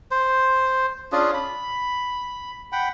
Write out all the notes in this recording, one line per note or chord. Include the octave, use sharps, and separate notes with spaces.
C5
C#4 D4 F4 G#4
B5
F#5 G5 B5